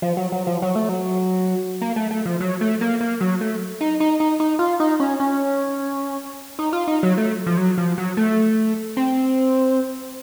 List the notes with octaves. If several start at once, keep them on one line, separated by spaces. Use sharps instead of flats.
F3
F#3
F#3
F3
F#3
A3
F#3
A#3
A3
A3
F3
F#3
A3
A#3
A#3
F#3
A3
D#4
D#4
D#4
D#4
F4
D#4
C#4
C#4
D#4
F4
D#4
F#3
A3
F3
F#3
F3
F#3
A3
C4